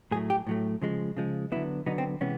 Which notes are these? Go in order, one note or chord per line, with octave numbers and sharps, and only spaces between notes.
A2 F#3 A3 G#4
G4
A2 F#3 A3
C#3 F3 G#3
C#3 F3 G#3
D3 F#3 B3 E4
D3 F#3 B3 D#4
C4
C3 E3 G#3 B3 C#4